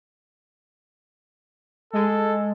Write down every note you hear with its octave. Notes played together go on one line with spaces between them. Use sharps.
G#3 A4